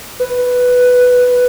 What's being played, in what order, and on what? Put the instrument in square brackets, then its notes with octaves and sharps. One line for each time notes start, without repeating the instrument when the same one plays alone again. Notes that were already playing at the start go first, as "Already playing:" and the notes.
[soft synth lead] B4